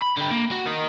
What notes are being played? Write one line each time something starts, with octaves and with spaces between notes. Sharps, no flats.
B5
D3 G4
A#3
F#4
A#4 D#5